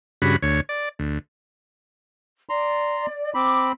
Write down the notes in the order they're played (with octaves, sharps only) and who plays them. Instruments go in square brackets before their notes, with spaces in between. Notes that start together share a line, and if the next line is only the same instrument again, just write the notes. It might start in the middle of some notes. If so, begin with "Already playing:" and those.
[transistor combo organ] G2 C#3 F#4 B5
D2 C#5
D5
D2
[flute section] D5 [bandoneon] A#5 C6
[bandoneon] C4 B5 [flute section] D6